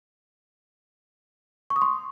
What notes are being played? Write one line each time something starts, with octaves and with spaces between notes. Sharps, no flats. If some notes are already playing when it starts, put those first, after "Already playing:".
C#6
D#6
C6